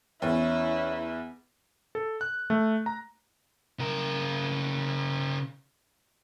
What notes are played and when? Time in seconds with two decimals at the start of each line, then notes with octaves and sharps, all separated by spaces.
0.22 E2 C#4 E4
1.95 A4
2.21 F#6
2.50 A3
2.86 A#5
3.79 C#3 A#4